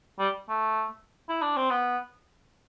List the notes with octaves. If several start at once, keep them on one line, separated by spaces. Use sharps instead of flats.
G3
A3
E4
D4
C4
B3